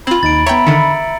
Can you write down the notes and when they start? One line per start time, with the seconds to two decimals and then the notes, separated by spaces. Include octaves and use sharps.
0.07 C4 F4 B5 G#6 F#7
0.23 D#2 D#4 A6 D7
0.46 B3 C#5 E5 G5 A#5
0.67 D3 D#3 E5 A6 C#7